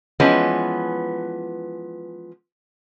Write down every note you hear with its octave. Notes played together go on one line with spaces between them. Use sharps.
E3 F3 G#3 B3 C#4